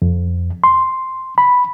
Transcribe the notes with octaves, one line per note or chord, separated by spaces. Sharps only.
F2
C6
B5